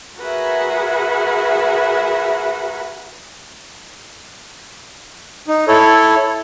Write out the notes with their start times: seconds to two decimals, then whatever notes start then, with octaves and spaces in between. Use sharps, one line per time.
0.18 F#4 G#4 A#4 B4 E5 F#5
5.48 D#4
5.68 E4 A4 C#5